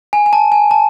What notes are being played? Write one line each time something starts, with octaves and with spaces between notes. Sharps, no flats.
G#5
G#5
A5
G#5
A5